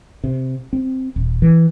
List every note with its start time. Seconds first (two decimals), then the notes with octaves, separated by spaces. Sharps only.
0.24 C3
0.73 C4
1.16 D#1
1.42 E3